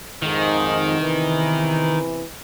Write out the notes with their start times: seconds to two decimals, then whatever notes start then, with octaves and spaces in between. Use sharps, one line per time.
0.22 F2 G#2 D#3
0.99 E2 C3 E3